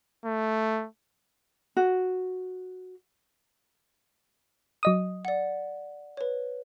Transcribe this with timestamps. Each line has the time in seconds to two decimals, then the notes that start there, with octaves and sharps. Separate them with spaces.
0.25 A3
1.77 F#4
4.83 F#3 D#5 D#6
5.25 D5 F#5
6.17 B4 C#5